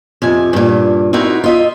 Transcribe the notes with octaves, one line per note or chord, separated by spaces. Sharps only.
F2 C3 G#5
G2 A#2
C4 D#4 E4 F#4 A#4
F4 D#5 E5